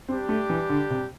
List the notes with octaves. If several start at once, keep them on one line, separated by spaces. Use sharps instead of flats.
G3 C4 D4 G4
A3
E3
D3
C3